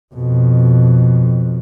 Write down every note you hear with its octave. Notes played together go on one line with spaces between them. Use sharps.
F2 B2